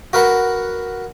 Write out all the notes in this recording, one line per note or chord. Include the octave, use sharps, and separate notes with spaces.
F#4 A#4 B4 F#5